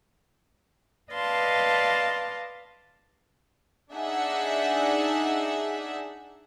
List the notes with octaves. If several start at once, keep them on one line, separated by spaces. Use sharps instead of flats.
B4 D5 D#5 F5 A5 C6
D4 D#4 G#4 E5 F#5